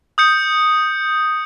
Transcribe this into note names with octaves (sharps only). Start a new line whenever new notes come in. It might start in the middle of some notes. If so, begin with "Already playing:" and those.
D#6 G6 C#7